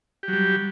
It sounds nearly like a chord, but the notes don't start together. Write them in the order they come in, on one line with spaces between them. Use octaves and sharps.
G4 F#3 G3